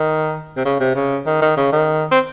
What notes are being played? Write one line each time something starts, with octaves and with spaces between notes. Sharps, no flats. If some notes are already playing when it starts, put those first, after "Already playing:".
Already playing: D#3
C3
C#3
C3
C#3
D#3
D#3
C#3
D#3
C4